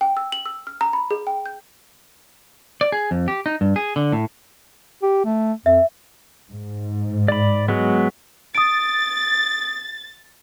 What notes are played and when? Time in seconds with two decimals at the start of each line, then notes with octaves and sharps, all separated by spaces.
0.01 G5
0.17 E6
0.32 F#7
0.46 E6
0.67 F6
0.81 A#5
0.93 B5
1.11 G#4
1.27 G5
1.46 G6
2.81 D5
2.92 G#4
3.11 F2
3.28 G4
3.46 D#4
3.61 G2
3.76 G#4
3.96 D3
4.13 A2
5.03 G4
5.25 A3
5.66 F2 E5
6.50 G#2
7.28 D5 B5
7.68 F#3 G#3 B3
8.55 D#6 A6 D7